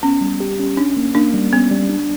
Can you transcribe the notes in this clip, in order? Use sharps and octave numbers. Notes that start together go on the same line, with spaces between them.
B3 C#4
G3
G4
C#4
C#4 D4
A#3
A#3 D4
G3
B3 C#4
G3
D4